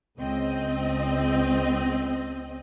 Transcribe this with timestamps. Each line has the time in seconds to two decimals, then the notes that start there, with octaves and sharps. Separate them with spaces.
0.19 C#2 C4 D#5